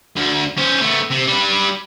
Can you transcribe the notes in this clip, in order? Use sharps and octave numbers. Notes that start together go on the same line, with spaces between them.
D2 D3
C#4 C5
A3 B3
C3
G3 B4